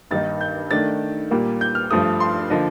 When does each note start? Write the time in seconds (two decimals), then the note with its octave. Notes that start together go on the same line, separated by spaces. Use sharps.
0.11 G2 D#3 A#3 D#4 A6
0.41 G6
0.71 D#3 A3 D4 A6
1.31 A#2 G3 A#3
1.61 G6
1.75 F6
1.91 G2 F3 A3 D#6
2.20 C6
2.50 D3 F3 A#3 D#5